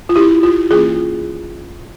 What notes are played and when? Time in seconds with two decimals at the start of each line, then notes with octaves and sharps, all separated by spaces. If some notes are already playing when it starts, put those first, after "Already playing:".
0.09 F4
0.16 E4 G4
0.43 F4
0.71 E3 A#3 C#4 F4 G#4